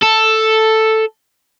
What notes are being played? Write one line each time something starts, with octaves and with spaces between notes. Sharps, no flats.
A4